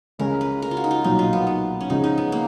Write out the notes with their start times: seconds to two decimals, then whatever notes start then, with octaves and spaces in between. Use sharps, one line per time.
0.19 C#2 C#3 G#3 C#4 G#4 A#4
0.41 B4
0.62 A#4
0.71 F4
0.77 F#4
0.84 D#4
0.91 F4
1.04 B1 A#2 F#3 D#4
1.19 F4
1.33 B3
1.47 B3
1.81 C#4
1.90 C#2 C#3 F3 G#3 D#4
2.04 D#4
2.18 B3
2.32 A#3